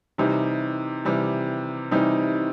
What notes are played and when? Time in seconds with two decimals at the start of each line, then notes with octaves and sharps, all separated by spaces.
0.18 C3 E3 G3 D#4
1.05 C3 E3 G3
1.91 C3 E3 G3 D#4